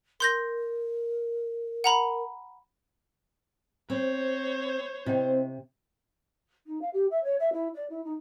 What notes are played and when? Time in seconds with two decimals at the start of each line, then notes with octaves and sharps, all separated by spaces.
0.20 A#4 C6 G6 A#6
1.84 F#5 A#5 B5
3.90 C4 C5 C#5
5.06 C3 C4 E4 D#5 G5
6.67 D#4
6.81 F5
6.93 G4
7.11 E5
7.23 C#5
7.40 E5
7.53 E4
7.74 D5
7.90 E4
8.05 D#4